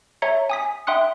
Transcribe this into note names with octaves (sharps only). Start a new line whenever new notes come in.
C#5 E5 A#5 G#6 C#7
G#5 D#6 B6
E5 G5 C6 D#6 F#6 C#7